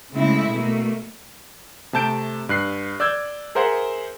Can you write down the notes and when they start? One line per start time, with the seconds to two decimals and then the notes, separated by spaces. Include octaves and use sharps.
0.13 C#3 G#3 A3 C4 E4
0.53 B2 A3 A#3
1.93 C3 A3 A5 G6 D7
2.49 G2 F#6 C7
3.00 D5 E6 G6 G#6
3.55 G#4 A#4 C5 E5 F#5